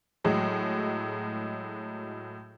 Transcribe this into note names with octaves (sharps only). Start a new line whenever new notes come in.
A2 F#3 G#3